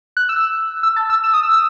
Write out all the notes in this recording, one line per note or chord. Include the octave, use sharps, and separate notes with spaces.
F#6
E6
E6
A5
E6
E6
D#6
E6
E6